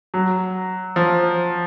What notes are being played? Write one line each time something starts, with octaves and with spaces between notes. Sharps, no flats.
F#3
F3